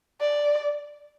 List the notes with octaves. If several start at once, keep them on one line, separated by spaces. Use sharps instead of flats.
D5